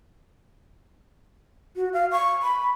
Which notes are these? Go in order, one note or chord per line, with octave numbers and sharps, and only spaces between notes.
F#4
F5
C#6
B5